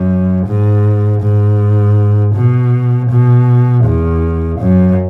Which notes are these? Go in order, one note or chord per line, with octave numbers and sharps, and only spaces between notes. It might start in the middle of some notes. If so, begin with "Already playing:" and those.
Already playing: F#2
G#2
G#2
B2
B2
E2
F#2